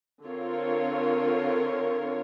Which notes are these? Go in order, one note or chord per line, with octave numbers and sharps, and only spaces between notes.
D3 C4 F4 A#4 C#5